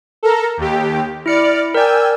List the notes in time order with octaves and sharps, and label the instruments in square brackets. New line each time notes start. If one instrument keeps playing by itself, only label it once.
[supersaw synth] A4 A#4 A#5
D#2 G4
[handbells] E4 C#7 [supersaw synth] D5 F6
[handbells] A#4 D5 [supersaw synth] G5 G#5 E6